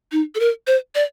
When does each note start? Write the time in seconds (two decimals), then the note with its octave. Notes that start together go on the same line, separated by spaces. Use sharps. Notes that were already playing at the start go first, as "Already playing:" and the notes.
0.12 D#4
0.35 A4
0.40 A#4
0.67 C5
0.95 D5